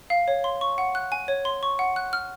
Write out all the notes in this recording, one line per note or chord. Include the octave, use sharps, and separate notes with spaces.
F5
C#5
C6
C#6
F#5
F#6
G#5
C#5
C6
C#6
F#5
F#6
F6